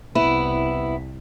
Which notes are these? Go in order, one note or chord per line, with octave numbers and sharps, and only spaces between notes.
C2 B3 E4